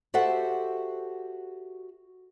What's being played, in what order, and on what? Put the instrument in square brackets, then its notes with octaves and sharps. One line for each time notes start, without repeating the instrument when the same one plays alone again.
[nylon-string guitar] F#4 G4 A4 C5 E5 F#5